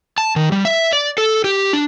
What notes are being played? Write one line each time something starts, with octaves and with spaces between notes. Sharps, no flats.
A5
D#3
G3
E5
D5
A4
G4
D4